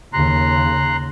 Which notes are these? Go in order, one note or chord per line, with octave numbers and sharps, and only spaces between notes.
D#2 C#3 A#5 C6 F#6